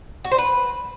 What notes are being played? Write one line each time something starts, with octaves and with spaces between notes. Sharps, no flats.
F#4
C5
B4